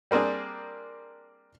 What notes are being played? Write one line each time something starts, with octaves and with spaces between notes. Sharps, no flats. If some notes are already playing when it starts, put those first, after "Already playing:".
G3 A#3 C4 D4 G#4